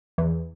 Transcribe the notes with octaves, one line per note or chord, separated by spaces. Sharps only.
E2